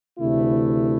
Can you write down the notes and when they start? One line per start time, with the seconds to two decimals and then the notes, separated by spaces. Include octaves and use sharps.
0.19 D2 C3 E3 A3 E4